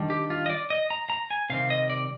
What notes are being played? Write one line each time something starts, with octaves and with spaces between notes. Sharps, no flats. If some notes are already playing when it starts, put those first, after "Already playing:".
Already playing: D#3 G3 D4
G4
F4
D#5
D5
D#5
A#5
A#5
G#5
C3 D#3 G3 C4 F5
D#5
D5